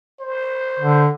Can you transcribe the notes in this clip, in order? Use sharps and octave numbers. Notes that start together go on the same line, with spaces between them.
C5
D3